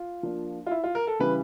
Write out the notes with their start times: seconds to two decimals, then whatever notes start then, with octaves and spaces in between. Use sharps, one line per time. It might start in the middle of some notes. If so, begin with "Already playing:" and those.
Already playing: F4
0.23 F3 A#3 D4
0.66 F4
0.71 E4
0.84 F4
0.95 A#4
1.07 A4
1.19 C#3 E3 G3 B4